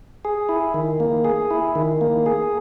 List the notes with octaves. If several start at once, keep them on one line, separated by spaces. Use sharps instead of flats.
G#4
E4
D#3
A#3
G#4
E4
D#3
A#3
G#4